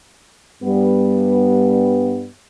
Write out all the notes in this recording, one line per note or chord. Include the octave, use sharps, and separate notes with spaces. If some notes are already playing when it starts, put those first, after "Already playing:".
G2 G3 B3